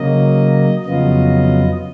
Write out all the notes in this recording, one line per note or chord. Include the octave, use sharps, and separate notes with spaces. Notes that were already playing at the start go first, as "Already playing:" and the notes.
Already playing: C#3 F#3 A#3 D#5
F2 C#3 F#3 B3 F4 D#5